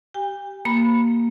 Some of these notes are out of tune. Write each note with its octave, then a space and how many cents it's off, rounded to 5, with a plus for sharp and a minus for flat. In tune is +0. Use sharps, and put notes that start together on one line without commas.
G4 -15 G5 +45
A#3 +0 B5 +0